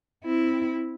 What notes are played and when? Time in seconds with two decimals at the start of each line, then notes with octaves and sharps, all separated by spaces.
0.24 C4 E4